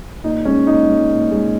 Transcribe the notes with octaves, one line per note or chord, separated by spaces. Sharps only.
A#2 D#4
G#3 C#4
A#2 D#4
G#3
A#2
G#3